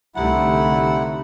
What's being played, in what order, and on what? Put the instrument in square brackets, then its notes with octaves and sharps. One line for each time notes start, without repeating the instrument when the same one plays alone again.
[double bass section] C2 D3 A3 [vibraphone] D#4 G4 A#5 [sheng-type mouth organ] E4 F#5